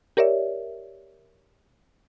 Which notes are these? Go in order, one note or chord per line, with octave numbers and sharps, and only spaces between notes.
G4 A#4 C#5 D5 E5